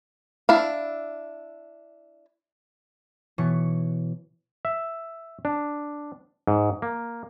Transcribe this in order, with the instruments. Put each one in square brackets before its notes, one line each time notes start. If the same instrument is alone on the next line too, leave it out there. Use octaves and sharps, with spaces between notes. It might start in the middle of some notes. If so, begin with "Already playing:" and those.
[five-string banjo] D4 E4 F5
[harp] B2 E3 C#5 C#7
[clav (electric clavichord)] E5
D4
G#2
A#3